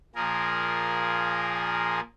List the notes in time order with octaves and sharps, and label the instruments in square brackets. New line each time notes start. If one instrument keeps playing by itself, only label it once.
[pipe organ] A#2 F3 G#4 A#4